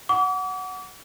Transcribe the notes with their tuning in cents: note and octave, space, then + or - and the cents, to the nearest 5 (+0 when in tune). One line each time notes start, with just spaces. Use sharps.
F#5 +0 D6 -40